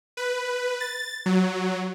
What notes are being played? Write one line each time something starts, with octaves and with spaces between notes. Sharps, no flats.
B4
A6
F#3